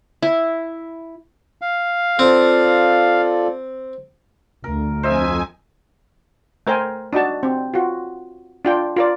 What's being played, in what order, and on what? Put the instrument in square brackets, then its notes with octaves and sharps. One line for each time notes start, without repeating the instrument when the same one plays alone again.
[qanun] E4
[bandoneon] F5
[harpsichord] C4 [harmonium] F4 A4 D5
[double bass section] D2 [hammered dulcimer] A#4
[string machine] F2 G#5 [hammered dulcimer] C5 D#5 E5
[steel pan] A3 A#4 C5 G5 G#5
D4 D#4 F#4 A5
C4
F4 F#4
D4 F4 G5
F4 A#4 D5